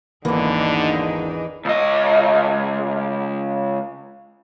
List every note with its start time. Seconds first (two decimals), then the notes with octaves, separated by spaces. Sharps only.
0.25 G#1 E2 D3 E3 A#3 D4 D#4 G#4
1.65 C#2 D#5